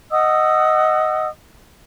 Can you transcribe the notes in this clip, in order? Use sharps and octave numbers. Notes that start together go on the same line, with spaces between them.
D#5 F#5 D#6 E6